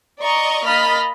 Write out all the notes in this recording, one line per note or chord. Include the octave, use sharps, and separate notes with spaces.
D5 D#5 A#5 C#6
A#3 D#5 B5 F6 A6